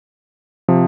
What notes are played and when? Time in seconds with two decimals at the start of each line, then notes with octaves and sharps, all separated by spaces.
0.68 C3 F3